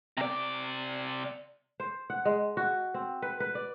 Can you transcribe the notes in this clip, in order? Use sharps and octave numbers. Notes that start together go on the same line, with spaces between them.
C3 D5
C5
F#5
G#3
F#4
C4
B4
B4
D5